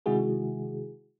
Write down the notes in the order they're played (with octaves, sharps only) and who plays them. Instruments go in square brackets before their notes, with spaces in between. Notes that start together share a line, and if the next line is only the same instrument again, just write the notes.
[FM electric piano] C3 D#3 G#3 E4 F#4 G#4